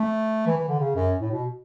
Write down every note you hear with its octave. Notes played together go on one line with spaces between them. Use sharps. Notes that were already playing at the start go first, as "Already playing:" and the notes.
Already playing: A3
E3
E3
D3
C#3
F#2
A2
B2